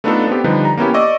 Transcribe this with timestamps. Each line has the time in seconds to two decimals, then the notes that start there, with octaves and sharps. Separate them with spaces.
0.04 A3 B3 D4 D#4 F4 A4
0.27 B3 C4 G4
0.44 D3 F3 G3 D4 D#4 B4
0.65 A#5
0.77 A#3 B3 C#4 E4 G4
0.94 D5 D#5 C#6 D6 E6